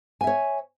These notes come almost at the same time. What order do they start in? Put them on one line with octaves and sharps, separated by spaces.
G#5 E5 C#5